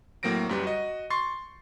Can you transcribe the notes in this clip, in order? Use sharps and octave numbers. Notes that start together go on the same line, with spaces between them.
A2 F#3 A#3 C4 A#6 D7
F#2 G3 B4
F#4 D#5
C6 C#6 A6 C7